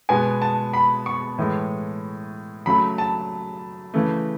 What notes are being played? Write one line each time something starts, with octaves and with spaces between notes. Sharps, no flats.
B2 G#3 B3 G#5
A5
B5
C#6
A2 E3 G#3
C#3 F#3 A3 B5
A5
C#3 E3 A3